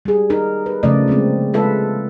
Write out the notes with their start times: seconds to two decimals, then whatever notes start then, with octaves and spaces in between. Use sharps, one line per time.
0.05 G3 G#4
0.30 D#4 A#4
0.66 B4
0.83 C#3 F3 A3 F4 D5 D#5
1.08 F#3 G#3 A#3 C4
1.54 G#3 F4 A4 B4 E5